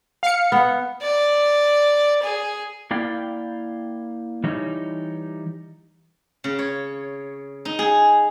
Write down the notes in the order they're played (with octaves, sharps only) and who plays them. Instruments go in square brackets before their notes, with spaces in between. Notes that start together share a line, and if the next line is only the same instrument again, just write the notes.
[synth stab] F5 C#7
[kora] B3
[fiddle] D5
G#4
[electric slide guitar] A#3 E4 D5 F5 G5
E3 G3 D#4 C#5
[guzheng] C#3
C#5
D#4
G#4